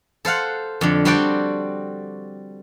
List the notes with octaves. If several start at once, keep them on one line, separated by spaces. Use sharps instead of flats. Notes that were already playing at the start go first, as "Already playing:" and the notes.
A4 C5 F5 F#5
F2 D3
G3 C4 F#4 A4 D5 G5